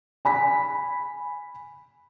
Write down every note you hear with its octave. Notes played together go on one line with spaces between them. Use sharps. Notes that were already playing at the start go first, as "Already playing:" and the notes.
G#5 B5 B6